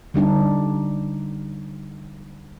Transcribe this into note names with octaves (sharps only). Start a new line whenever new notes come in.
D3 G3 D4 D#4